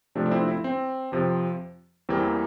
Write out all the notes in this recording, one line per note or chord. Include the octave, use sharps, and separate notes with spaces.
C3 F3 A3 D4
D4
C4 E4
C4 E4
C4
F2 C3 F3
E2 E3 G3 A#3 C4